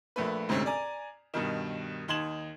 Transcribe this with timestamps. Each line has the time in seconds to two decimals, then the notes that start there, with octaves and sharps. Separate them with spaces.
0.16 A#1 A3 A#3 B4
0.49 D2 G#2 C3 C4 C#4
0.66 D5 G#5 A#5
1.34 G2 B2 D#3
2.08 D#2 D#4 C6 G#6 E7 F#7